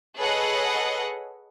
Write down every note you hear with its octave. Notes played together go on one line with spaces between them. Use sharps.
G#4 A4 B4 C#5 D#5 F#5